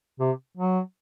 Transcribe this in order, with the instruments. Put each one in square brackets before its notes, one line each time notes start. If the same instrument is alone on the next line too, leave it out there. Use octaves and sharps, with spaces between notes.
[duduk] C3
F#3